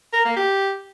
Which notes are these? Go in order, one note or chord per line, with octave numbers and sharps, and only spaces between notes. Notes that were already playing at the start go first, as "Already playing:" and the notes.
A#4
A#3
G4